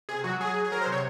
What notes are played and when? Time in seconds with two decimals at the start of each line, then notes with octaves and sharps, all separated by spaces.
0.09 C3 G#4
0.24 F#3 F#4
0.40 F#3 G#4
0.56 F#3
0.65 G#4
0.72 F#3 A#4
0.82 C5
0.87 C3
0.92 C#5